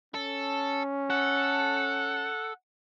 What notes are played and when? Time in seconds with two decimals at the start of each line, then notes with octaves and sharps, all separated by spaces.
0.15 C#4 A4
1.10 A4 F#5